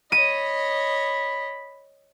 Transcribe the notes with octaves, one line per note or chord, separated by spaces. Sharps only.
C#5 D#5 B5 D#7